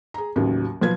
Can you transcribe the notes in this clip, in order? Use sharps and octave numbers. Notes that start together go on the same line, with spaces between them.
G#4 A#5
A1 D#2 C#3 F#3
B1 F3 F4 B4 G#6